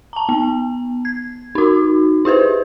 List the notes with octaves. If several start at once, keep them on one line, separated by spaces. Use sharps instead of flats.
A5 A#5
B3
G#6
D#4 F#4
E4 G4 B4 C5